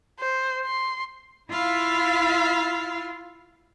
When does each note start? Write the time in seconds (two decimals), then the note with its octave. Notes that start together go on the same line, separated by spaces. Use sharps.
0.20 C5
0.65 C6
1.50 E4 F4 E5 F5 B5